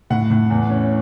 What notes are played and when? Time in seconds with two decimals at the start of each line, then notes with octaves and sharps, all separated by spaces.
0.10 A2 F#5
0.30 A2
0.50 E2
0.70 C#4